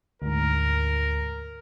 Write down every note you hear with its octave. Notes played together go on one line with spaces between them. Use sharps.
D2 G#2 A#4